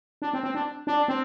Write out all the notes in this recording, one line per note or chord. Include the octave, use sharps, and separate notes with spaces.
D4
C4
C4
D4
D4
C4